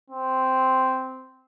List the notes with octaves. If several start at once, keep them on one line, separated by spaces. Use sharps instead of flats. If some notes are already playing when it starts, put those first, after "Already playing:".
C4